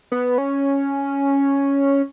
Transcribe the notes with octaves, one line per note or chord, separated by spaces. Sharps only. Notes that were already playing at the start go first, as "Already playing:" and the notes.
B3
C#4